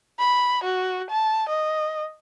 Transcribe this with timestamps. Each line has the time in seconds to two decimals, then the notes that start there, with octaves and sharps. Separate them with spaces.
0.19 B5
0.64 F#4
1.11 A5
1.49 D#5